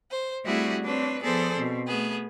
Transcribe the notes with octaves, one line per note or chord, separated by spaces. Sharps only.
C5
G3 A3 C4 E4 F#4 G#4
C4 D4 B4 C#5
F3 B3 G#4 A4 C5 D5
B2 C4
A3 B3 G#4